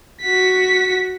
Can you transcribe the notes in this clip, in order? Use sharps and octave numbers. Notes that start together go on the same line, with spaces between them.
F#4 B6